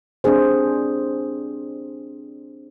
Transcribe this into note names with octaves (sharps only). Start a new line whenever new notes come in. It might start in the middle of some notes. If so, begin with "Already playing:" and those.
C4 D4 G4 G#4 C5